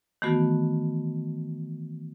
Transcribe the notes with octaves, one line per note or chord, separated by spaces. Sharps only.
D#3 E3 A3 B3 F#4